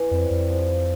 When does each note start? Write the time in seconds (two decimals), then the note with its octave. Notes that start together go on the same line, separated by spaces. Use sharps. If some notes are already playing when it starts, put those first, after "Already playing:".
Already playing: E3
0.11 F2 G3 C4
0.30 F2
0.50 F3